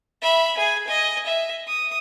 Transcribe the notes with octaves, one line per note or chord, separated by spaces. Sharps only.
E5 B5
G#4 G#5
D#5 G#5
E5
D#6